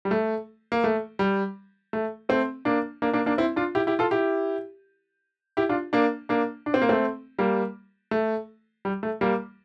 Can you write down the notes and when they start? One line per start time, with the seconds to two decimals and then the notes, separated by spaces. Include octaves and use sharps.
0.05 G3
0.11 A3
0.72 A#3
0.84 A3
1.19 G3
1.93 A3
2.29 A3 C4
2.65 A#3 D4
3.02 A#3 D4
3.13 A#3 D4
3.26 A#3 D4
3.38 C4 E4
3.56 D4 F4
3.75 E4 G4
3.87 E4 G4
3.99 F4 A4
4.11 E4 G4
5.57 E4 G4
5.69 D4 F4
5.93 A#3 D4
6.29 A#3 D4
6.66 D4
6.74 C4
6.82 A#3
6.89 A3 C4
7.39 G3 A#3
8.11 A3
8.85 G3
9.03 A3
9.21 G3 A#3